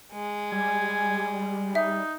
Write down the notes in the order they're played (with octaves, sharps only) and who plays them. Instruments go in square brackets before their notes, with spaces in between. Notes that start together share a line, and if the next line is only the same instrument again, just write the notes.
[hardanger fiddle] G#3
[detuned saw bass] G3 [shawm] G#5
[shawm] D#4 [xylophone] E5